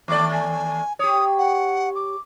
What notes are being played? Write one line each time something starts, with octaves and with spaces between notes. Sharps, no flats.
D#2 A3 D5 D6
G#5
G4 C#5 D#6
F#5
D6